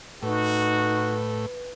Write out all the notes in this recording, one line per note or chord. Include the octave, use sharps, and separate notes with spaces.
A2 D#4 F#4 B4